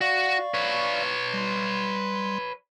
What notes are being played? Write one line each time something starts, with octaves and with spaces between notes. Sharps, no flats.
F#4 D5 F5 C#6
B4 C#5
G3 C6